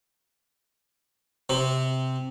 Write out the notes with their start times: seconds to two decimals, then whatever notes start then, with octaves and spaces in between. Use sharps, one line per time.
1.49 C3